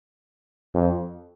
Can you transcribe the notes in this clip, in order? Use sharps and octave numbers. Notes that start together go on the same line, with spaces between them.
F2